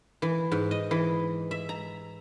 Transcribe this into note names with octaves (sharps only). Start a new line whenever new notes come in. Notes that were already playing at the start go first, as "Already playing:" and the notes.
E3
G#2
D#5
E3
E5
A#5